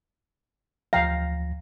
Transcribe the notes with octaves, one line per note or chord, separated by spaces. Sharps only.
D2 F3 F5 G5 A#5 A#6